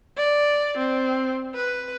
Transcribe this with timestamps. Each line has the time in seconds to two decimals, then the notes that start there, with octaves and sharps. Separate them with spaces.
0.18 D5
0.78 C4
1.55 B4